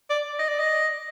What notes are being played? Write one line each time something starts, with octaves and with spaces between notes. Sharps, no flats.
D5
D#5
D5
D#5